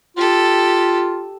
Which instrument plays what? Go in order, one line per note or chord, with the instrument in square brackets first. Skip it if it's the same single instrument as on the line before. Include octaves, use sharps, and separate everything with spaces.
[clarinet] F4 [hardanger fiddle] G4 A4